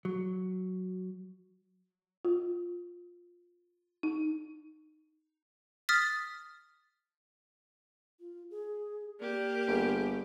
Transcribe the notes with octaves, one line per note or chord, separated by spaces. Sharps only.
F#3
F4
D#4
D#6 F6 A6 B6
F4
G#4
A#3 G4 D5
G1 G#4